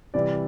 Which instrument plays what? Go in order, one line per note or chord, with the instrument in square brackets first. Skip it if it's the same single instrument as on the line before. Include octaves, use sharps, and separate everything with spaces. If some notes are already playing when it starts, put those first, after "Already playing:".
[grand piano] C3 E3 G3 [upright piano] D5